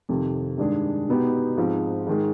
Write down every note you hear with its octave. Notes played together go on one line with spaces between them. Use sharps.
F2 C3 D#3
G2 D#3 G#3 D4 G#4
B2 B3 D#4 G4
G#2 F3 C4
G#2 D#3 G#3